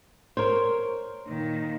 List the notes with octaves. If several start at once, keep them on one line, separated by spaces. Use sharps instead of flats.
A#4 C5 C#5
A#2 D#3